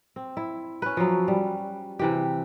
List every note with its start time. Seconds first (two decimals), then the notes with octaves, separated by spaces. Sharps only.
0.16 C4
0.37 E4
0.82 C#4 B4
0.97 F3 F#3
1.28 G3
1.99 C3 E3 G4